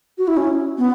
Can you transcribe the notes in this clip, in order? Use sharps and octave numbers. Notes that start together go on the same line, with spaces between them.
F#4
E4
C#4
B3